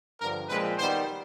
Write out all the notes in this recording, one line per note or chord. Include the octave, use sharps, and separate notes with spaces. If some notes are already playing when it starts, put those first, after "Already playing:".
G2 D3 F3 A#4
A#2 F3 G#3 C4 B4
D#3 G3 B3 C5